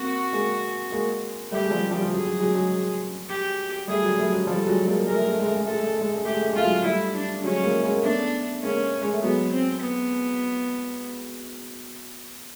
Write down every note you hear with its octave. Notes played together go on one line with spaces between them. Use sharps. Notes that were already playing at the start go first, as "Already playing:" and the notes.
Already playing: A#3 C4 F#4
G#3 A#3
G#3 A#3
G3 A3 G4
G#3
F3 G3
F3 G3
F3
F#3 G#4
F#3
F#3 G#3
F#3 G#3
G4
G3 A3 G#4
F#3
G3 A3
F#3 G#3
F3 G3 A4
F#3 G#3
G#3 A#3
G#3 A#4
A3
G#3
A3
G#3
A3
G#3
A3
G#3 A4
A3
G#3
A3
G#3
A3
G#3
A3 G4
G#3
A3
G#3
A3 F4
F#3 G#3
G3 A3 E4
D4
F#3 G#3 C#4
G#3 A#3
G#3 A#3
A#3
A3 B3 D4
G#3 A#3 C#4
G#3
A3
F#3 G#3 B3
C4
B3